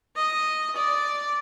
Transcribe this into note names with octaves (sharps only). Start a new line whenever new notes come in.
D#5
D5